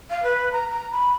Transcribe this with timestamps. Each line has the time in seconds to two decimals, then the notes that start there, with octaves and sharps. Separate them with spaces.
0.10 F5
0.23 B4
0.52 A#5
0.71 A#5
0.92 B5